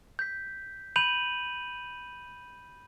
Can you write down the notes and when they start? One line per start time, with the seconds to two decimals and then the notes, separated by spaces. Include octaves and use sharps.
0.19 G6 B6
0.96 B5 G6 D#7 F7 F#7